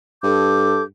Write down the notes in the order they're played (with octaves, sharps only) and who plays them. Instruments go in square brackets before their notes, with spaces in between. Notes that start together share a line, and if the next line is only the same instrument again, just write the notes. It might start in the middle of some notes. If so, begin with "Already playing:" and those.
[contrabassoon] G2 [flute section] A4 D6 G6